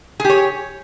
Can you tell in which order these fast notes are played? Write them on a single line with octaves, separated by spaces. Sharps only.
G#4 G4 C#5